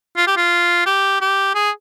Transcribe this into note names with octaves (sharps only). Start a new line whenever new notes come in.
F4
G4
F4
G4
G4
G#4